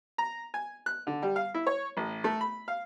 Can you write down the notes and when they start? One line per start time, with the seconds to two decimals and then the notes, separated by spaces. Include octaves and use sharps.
0.18 A#5
0.54 G#5
0.86 F#6
1.07 D3
1.22 G3
1.36 F5
1.54 E4
1.67 C#5
1.97 A1
2.24 A3
2.41 B5
2.68 F5